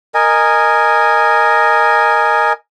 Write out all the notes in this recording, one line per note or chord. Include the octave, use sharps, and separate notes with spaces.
A#4 D#5 G#5